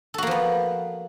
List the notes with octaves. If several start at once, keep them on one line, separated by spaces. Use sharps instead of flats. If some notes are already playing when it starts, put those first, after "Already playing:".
F3 A#3 B3 F#4 A4